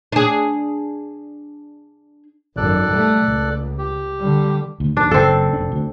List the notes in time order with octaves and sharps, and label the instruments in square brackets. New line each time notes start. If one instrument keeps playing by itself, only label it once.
[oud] D4 G#4
[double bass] G#1 F#2 [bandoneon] A4 D5 F#6
[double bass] G3 A3
C#2
[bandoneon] G4
[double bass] D3 G3
[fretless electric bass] D2
[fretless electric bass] D#2 [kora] D4
[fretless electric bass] F#1 [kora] C4 A4
[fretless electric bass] F1 D4
D2